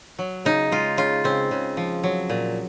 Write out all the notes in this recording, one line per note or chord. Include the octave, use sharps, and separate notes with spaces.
F#3
C#3 D#4
G#3 F4
C#3 F4
C#3 C4
C#3
F3
F#3
A#2